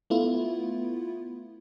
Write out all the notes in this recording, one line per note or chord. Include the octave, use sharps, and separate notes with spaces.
A3 B3 E4 F4